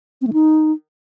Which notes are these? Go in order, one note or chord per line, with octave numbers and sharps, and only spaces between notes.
C4
A3
D#4